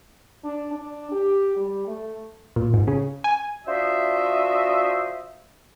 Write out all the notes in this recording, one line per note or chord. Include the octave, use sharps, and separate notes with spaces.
D4
D4
G4
G3
A3
A#2
G#2
C#3
G#5
D4 F4 F#4 C5 D#5 E5